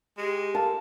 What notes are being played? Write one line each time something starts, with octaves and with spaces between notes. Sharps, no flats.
G#3 G4
A4 A#4 F5 A5